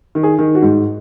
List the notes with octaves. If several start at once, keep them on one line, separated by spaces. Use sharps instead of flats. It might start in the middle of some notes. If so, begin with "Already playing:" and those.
D#3
G#4
D#3
F#4
G#2